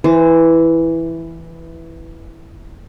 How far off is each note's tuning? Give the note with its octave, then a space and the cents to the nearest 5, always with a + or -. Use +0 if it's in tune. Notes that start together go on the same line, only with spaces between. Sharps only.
E3 +0 C5 -25